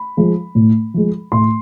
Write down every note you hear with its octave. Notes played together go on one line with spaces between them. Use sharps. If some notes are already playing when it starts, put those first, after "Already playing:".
Already playing: B5
F3 G#3
A2
F3 G#3
A2 C6